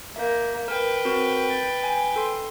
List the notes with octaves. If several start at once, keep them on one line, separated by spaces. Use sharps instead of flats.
A#3 E5 G6
A#4 B4 G5
C4 F#4 A#4
A6
G#5
A4 C6